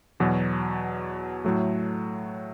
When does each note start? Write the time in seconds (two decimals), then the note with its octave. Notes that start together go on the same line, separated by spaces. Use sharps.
0.20 E2 B2 F#3
1.45 A2 F#3 A3